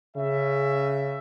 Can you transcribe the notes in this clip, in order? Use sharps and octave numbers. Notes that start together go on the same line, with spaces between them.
C#3 E5